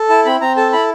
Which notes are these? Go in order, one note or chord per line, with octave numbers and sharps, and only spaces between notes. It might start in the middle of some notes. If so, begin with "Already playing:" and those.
Already playing: A4
E4 A5
C4 B5
C4 A#5
A4 A5
E4 B5